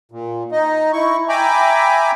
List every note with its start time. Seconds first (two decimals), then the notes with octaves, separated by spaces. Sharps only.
0.12 A#2
0.52 D#4 D#5
0.93 E4 C#6
1.29 E5 G5 G#5 A#5 B5 D6